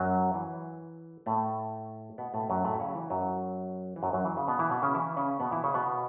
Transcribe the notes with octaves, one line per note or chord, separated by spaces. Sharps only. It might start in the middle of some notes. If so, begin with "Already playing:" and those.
Already playing: F#2 F#3
E3
A2 A3
B2 B3
A2 A3
F#2 F#3
A2 A3
E4
C#3 C#4
F#3
E3
F#2 F#3
E3
F#2 F#3
F#2 F#3
E3
C#3
B2 B3
E3 E4
B2 B3
C#3 C#4
E3 E4
C#3 C#4
B2 B3
E3 E4
C#3 C#4
B2 B3